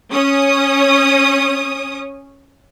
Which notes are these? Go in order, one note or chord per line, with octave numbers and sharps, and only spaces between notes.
C#4 C#5 D#6